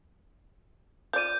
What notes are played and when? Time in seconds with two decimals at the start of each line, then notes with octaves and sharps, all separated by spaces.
1.13 F3 D5 G6 D#7